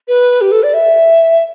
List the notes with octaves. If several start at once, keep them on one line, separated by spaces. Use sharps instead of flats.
B4
G4
A4
D5
E5